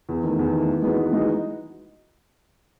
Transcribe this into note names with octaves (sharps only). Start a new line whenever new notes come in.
E2
D#3 A3
E2
D#3 A3
E3
G#3 B3 D#4 F#4
E3
G#3 B3 D#4 F#4